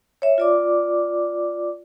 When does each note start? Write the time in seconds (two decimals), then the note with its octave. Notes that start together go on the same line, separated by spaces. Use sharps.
0.22 C#5 E5
0.38 F4 D5 D6